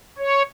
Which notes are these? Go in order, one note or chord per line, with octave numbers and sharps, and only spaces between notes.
C#5